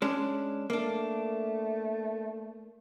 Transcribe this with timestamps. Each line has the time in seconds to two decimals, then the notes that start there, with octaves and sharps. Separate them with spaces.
0.02 G#3 C#4 D4
0.70 A3 A#3 D4